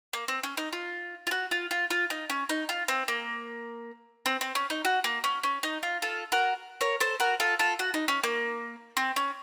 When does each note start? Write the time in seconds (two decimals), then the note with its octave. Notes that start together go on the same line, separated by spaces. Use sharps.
0.13 A#3
0.28 C4
0.43 C#4
0.57 D#4
0.73 F4
1.27 F4
1.31 F#4
1.51 F4
1.71 F4
1.90 F4
2.10 D#4
2.30 C#4
2.49 D#4
2.69 F4
2.88 C4
3.08 A#3
4.26 C4
4.41 C4
4.55 C#4
4.70 D#4
4.85 F#4
5.04 A#3
5.24 C#4
5.43 C#4
5.63 D#4
5.83 F4
6.02 F4 A4
6.32 F#4 A#4
6.81 A#4 C#5
7.00 A4 C5
7.20 F#4 A#4
7.40 F4 A4
7.59 F4 A4
7.79 F#4
7.94 D#4
8.08 C#4
8.24 A#3
8.97 C4
9.16 C#4